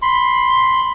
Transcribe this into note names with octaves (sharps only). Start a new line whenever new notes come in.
B5 C6